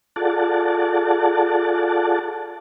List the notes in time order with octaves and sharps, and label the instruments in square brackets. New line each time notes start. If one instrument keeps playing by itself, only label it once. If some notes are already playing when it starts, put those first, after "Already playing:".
[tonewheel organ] F4 G#4 A4 D5 F#5 A5